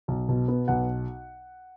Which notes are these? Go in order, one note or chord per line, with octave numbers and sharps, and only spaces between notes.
B1
B2
B3
B1 F#5